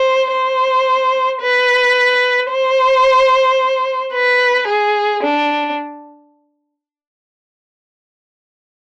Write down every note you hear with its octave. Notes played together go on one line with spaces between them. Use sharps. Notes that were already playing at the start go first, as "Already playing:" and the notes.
Already playing: C5
C5
B4
C5
B4
G#4
D4